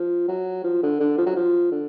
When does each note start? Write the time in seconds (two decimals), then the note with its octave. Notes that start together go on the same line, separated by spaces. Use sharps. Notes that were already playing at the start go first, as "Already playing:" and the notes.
Already playing: F3
0.28 F#3
0.64 F3
0.83 D3
1.00 D3
1.18 F3
1.26 F#3
1.36 F3
1.72 D3